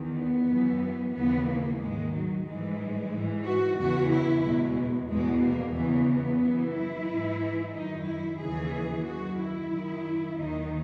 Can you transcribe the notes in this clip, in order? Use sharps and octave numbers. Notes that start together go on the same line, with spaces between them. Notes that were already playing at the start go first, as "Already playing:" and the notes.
Already playing: E2 D#3
B3
F#2 E3
D#2 C#3 E3 B3
A#3
G#2 D#3 G#3
F#3
G#2 E3 G#3
G#2 E3
F#4
E2 C#3 E3 F#4
E4
E2 B2 G#3
E2 B2 G#3
A#3
E2 C#3 E3 B3
B3
F#2 E3
E4
G#2 E3
F#2 D#3 D#4
E4
D#2 C#3 E3 G#4
F#2 D#3 F#4
E4
F#2 D#3
D#2 D#3 D#4